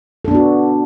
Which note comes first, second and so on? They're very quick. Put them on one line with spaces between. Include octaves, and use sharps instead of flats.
A4 D4 B3 F#4